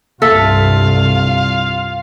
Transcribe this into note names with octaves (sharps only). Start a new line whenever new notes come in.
C2 G2 F4 A4 E5 F5